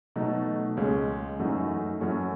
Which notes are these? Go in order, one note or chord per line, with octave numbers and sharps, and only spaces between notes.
B2 F#3 A3 D#4
C#2 C#3 G#3 C#4
F#2 E3 A3 D#4 F#4
F#2 E3 A3 C#4 F#4